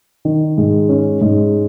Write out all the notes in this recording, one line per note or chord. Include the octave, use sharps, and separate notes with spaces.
D#3
G#2
C#4
G#2